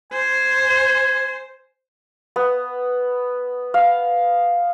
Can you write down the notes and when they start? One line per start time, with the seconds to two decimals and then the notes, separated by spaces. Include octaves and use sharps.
0.12 C5 G#5
2.36 B3
3.74 F5